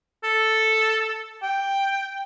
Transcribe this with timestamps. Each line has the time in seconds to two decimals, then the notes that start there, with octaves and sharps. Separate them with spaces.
0.24 A4
1.42 G5